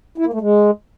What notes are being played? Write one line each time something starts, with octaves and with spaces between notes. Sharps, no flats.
E4
A#3
A3
G#3